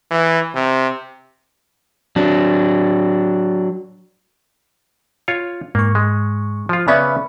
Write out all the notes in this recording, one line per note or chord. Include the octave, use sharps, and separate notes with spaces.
E3
C3
F#3 D4
F4 C#5
G#2 A#3 C#6
G#3
F3 F4
C#3 B3 C#4 D5 E5 B5